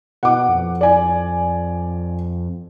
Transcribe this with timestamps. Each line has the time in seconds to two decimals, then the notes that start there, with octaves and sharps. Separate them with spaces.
0.23 B2 F#5 D6
0.49 F2
0.81 D5 G#5